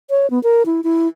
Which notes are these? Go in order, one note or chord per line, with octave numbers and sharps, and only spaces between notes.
C#5
B3
A#4
E4
E4